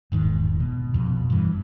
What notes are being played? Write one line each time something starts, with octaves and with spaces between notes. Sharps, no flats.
E1 G#2 D#3
B2
F2 B2
G2 E3